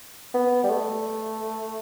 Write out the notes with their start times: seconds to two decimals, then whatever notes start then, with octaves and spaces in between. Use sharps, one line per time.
0.34 B3
0.64 G3
0.70 A3